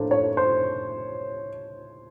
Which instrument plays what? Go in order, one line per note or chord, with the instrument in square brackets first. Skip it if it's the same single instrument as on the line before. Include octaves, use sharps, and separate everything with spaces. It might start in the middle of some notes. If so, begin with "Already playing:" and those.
Already playing: [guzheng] A2 F3 A#3 D4 [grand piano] C5
[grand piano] C#5
C5